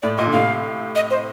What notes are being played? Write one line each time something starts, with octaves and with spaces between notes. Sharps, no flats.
A2 D5
A#2 D#5
D3
A2 C3 F5
D#5
C5